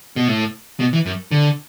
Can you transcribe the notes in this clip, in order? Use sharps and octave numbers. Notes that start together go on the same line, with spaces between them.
B2
A2
B2
E3
F#2
D3